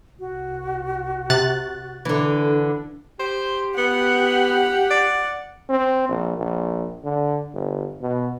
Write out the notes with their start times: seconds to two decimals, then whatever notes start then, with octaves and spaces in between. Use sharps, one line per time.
0.20 C2 F#4
1.30 C3 F#6 A6
2.05 D3 E3 D4
3.19 G4 C5
3.78 B3 F#5
4.90 D5
5.70 C4
6.09 A#1
6.38 A#1
7.04 D3
7.54 G1
8.02 B2